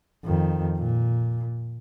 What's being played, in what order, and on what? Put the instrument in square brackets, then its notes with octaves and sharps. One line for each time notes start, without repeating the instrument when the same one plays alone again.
[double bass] F2 D#3
A#2